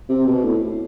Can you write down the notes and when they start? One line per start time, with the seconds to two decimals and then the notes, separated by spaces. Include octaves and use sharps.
0.09 C3
0.26 B2
0.44 A2